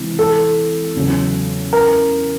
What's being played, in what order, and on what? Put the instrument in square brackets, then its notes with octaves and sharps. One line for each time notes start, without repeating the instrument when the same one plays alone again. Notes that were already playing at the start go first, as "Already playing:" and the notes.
Already playing: [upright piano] C3 E3 G#3
[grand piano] A4
[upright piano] E2 C#3 F#3
[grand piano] A#4